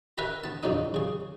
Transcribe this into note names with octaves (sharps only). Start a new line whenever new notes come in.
A#4 B4 E5 G#5 A#5 B5
B3 A5
A#1 E2 F#3 D4 D#4 D#6
C#3 G#4